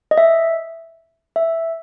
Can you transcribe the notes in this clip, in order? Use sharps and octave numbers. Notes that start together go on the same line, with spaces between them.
D#5
E5
E5